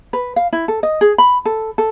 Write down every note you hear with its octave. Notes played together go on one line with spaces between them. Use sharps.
B4
F5
E4
A4
D#5
G#4
B5
A4
A4